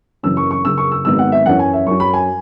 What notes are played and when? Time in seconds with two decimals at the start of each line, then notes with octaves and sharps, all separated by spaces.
0.23 F#1 F#2 E3 C#4 E6
0.37 C#6
0.51 C#6
0.64 F#1 F#2 C#3 E6
0.78 C#6
0.92 E6
1.05 G#1 G#2 F#3 B3 E6
1.19 F#5
1.32 E5
1.46 F#2 E3 C#4 F#5
1.59 G#5
1.73 E5
1.86 F#2 F#3 C#4 C#6
2.00 B5
2.13 G#5